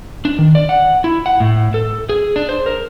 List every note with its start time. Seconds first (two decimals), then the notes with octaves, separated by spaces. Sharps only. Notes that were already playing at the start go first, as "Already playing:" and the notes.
0.25 D4
0.39 D#3
0.55 D5
0.69 F#5
1.04 E4
1.26 F#5
1.40 A2
1.74 A4
2.09 G#4
2.36 D4
2.49 C5
2.66 A#4